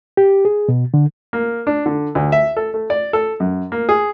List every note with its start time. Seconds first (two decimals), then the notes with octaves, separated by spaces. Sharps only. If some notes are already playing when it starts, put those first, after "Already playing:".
0.17 G4
0.45 G#4
0.69 B2
0.94 D3
1.33 A#3
1.67 D4
1.86 D3
2.15 D2
2.32 E5
2.57 A4
2.74 A3
2.90 D5
3.13 A4
3.40 F#2
3.72 A#3
3.89 G#4